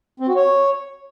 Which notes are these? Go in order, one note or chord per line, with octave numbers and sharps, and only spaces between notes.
C4
F#4
C#5